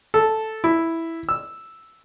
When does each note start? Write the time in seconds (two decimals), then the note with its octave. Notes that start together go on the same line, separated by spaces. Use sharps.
0.14 A4
0.64 E4
1.29 E6